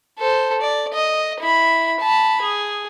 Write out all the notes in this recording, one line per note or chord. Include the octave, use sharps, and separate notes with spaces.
A4 C5
D5
D#5
E4 B5
A5 B5
G#4